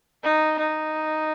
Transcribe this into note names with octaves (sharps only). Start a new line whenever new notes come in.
D#4
D#4